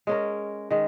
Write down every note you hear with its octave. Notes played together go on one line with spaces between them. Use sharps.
G#3 C#4 A#4
D#3 G#3